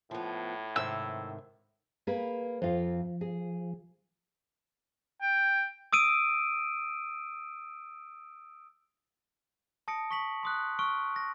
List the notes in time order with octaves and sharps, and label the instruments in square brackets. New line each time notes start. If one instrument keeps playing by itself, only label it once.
[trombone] A2 [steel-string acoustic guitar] F3 B3
[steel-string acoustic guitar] G#2 C3 D#3 [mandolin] E6
[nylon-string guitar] A#3 G#4 B4
[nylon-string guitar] F2 F4 [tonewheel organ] F3
[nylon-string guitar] G#4
[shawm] G5
[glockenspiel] D#6 E6 D7 D#7
A5 D#6 A#6 C#7 D7
C#6 B6 F#7
C6 D#6 F#6
C#6 F6 D7
A#6